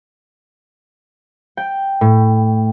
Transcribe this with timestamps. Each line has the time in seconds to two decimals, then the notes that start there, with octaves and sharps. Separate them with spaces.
1.57 G5
2.01 A2